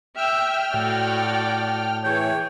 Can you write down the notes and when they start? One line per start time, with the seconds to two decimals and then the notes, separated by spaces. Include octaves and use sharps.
0.17 E5 G5 F6
0.74 A2 F#4 D5
2.04 E3 G#4 C#5 G5